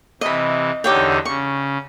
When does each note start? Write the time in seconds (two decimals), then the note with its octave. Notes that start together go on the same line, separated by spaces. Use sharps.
0.21 C3 E3 D#5 B5
0.84 E2 D3 D#4 G4 C#5 G5
1.25 C#3 C#6